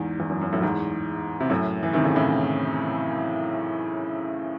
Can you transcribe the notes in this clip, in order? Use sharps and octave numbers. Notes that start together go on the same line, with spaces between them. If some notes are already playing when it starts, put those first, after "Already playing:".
Already playing: E2 G#2
E2
F#2
F#2
F#2 A2
E2 G#2
C3
F#2 A2
E3
C3 D#3
A2 C#3
A2 C#3